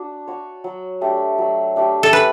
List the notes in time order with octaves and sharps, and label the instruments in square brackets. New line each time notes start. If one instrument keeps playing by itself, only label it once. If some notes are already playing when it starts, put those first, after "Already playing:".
Already playing: [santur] D4 F#4
F#4 C#5
F#3
A3 D4 G4
F#3
A3 D4 G4
[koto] A4
[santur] C#4 [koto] B4